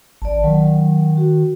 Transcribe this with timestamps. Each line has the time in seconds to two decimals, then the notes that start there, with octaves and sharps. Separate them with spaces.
0.22 A1 D5 A5
0.44 D#3 F#3
1.17 F#4